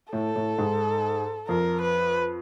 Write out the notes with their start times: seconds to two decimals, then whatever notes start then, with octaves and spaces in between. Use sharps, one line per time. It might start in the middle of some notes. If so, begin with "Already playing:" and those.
0.12 A2 A4
0.36 A2
0.58 G#2
1.48 F2 A#4
1.82 B4